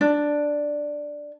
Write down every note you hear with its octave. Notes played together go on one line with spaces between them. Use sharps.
D4